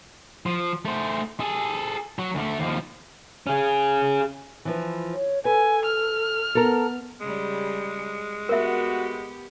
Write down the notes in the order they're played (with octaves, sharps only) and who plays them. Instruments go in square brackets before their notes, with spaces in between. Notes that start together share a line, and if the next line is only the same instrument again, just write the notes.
[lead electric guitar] F3
A3 C5
G#4 A4
F#3
D2 A3
D#2 F3
C#4 G#4
[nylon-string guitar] E3 F3 B4
[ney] C#5
[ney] A4 [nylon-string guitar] B4 [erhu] G#5
[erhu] F6
[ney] B3 [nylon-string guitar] A4 A#4
[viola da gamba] C#3 G3 [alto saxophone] G#3
[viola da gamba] B3 G4 [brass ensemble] F#4 [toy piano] A#4 E5